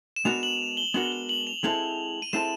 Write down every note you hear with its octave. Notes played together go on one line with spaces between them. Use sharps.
E7
G#3 B3 D4 F#4 A#4 F7
F#7
G7
G#3 B3 D4 F#4 A#4 F#7
G7
F#7
F7
G#3 C4 E4 A4 F7
D#7
G#3 C4 E4 A4 E7